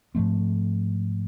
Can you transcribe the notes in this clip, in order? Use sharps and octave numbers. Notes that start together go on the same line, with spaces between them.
G#2 F3 A3 C4